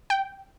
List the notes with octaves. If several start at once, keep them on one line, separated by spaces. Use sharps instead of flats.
G5